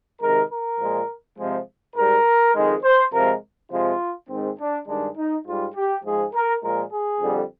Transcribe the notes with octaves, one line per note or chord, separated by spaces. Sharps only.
C3 D#3 G#3 A#4
A#4
A#2 F3 G#3
C3 F3 G#3
G#2 G3 A#4
F2 D#3 G#3
C5
C3 F3 G#3 A#4
C3 F3 G#3 F4
G#2 D#3 G#3 C4
D4
G2 D#3 G#3 D4
D#4
G#2 G3 F4
G4
G#2 F3 G#3 G#4
A#4
A#2 F3 G#3 A#4
G#4
F2 D3 G3